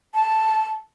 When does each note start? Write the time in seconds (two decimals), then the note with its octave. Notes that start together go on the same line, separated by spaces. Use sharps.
0.15 A5